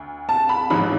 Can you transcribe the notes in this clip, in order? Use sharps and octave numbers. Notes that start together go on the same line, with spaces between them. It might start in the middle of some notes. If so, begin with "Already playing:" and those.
Already playing: D2
A5
B5
A1 G#2 F3 B5